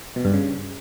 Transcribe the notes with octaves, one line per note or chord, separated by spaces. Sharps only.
B2
G2
C#3